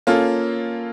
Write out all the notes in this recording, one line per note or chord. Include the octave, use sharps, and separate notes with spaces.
A#3 C#4 F4 A4